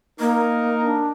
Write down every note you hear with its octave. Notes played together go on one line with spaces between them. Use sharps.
A#3 D#4 A#4
D4